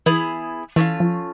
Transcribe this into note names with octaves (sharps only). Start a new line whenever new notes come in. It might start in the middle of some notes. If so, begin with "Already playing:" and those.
E3 B3 E4 G#4
E3 A3 C#4 F4
F3